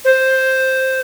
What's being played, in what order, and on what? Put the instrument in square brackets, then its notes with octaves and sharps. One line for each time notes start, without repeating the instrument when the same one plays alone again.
[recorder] C5